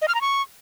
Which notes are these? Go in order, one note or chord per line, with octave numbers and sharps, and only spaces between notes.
D#5
F6
A#5
C#6